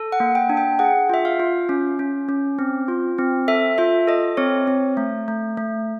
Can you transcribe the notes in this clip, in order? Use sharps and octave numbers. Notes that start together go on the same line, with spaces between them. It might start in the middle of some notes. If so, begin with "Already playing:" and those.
Already playing: A4
F#5
A#3
G5
D4
G5
G#4 F#5
F4 E5
F5
F4
C#4
C#4
C#4
C4
F4
C4
A4 E5
F4 E5
A4 D#5
C4 C#5
C4
A3
A3
A3